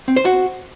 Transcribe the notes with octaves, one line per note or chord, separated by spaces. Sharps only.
C4
C5
F#4